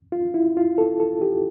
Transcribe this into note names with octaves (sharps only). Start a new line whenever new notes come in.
F4
E4
F4
A4
A4
G4